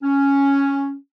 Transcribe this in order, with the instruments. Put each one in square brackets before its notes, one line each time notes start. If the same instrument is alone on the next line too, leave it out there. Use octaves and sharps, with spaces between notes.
[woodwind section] C#4